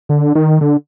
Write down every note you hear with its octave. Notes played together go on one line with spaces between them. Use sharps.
D3
D#3
D3